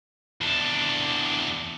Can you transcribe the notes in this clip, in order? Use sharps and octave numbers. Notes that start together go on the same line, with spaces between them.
E2 D4